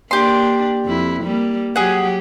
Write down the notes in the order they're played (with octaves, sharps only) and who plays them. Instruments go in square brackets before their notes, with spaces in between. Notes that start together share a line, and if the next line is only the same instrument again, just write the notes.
[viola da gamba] A#3 D4 [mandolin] G4 C6
[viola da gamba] F2 E4
G3 A#3
[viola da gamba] F#3 G4 [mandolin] G#4 F#5